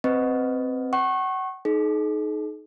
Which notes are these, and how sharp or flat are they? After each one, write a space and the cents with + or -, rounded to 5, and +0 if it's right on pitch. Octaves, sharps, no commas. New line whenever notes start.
C4 +0 B4 +20 D#5 +0
F#5 +30 C#6 -25
D#4 +0 G#4 +45